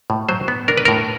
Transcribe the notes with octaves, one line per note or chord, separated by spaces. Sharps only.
A2
F#3 C5
B3
D4 A#4
B4
A#4
A2